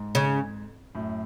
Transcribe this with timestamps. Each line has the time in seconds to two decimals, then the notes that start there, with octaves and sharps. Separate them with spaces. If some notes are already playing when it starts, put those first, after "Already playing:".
Already playing: G#2
0.15 C#3
0.95 F#2 A2